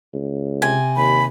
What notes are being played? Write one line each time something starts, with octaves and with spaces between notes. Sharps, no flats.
C#2
C3 G#5
D#2 B5